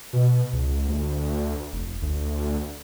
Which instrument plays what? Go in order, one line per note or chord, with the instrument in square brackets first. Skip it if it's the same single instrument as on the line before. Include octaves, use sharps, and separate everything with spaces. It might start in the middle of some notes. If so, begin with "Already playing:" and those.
[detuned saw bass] B2
C#2
D2
F1
D2